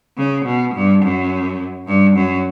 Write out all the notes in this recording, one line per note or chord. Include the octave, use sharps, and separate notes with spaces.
C#3
B2
G2
F#2
G2
F#2